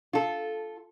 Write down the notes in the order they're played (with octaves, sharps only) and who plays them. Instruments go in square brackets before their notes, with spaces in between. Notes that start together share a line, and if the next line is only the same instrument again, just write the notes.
[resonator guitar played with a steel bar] F4 A4